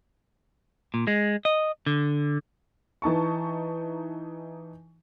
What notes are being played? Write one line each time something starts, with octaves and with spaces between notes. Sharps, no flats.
A#2
G#3
D#5
D3
E3 D#4 A5 C#6